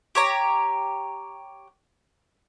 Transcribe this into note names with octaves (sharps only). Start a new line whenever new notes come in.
G4 C#5 A#5